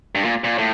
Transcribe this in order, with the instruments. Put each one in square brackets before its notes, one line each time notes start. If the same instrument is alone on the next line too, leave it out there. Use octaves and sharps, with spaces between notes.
[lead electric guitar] G2
A#2
A#2
A2